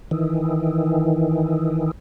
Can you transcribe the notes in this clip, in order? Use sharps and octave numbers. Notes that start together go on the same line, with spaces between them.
D#3 E3